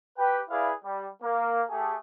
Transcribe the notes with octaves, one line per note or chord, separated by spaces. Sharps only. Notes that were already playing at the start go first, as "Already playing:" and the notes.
G4 B4 G5
E4 G#4 B4 D5 E5 F5
G3
A#3
A3 G4 G#4